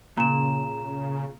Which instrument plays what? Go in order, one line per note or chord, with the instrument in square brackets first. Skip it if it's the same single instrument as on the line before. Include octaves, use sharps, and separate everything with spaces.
[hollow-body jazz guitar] A#2 [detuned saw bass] C#3 [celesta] A#5 E7